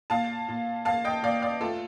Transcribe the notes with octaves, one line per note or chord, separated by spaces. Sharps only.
A#2 F5 A5
A#2
A#3 F5 A5
D#5 G5
A#2 D5 F5
D5 F5
A3 F4 A4